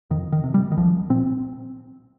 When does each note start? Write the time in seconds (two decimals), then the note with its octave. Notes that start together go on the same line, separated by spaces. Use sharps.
0.11 F2 D#3
0.32 D#3
0.44 C3
0.54 G3
0.72 D#3
0.77 C2 F3
1.10 A#2 C4